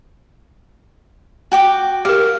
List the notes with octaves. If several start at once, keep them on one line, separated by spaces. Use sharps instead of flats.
F#4 G5 D6
G4 A#4 F5